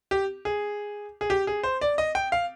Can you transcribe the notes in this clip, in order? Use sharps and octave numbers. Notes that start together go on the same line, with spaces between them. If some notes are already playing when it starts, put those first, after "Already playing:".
G4
G#4
G#4
G4
G#4
C5
D5
D#5
G5
F5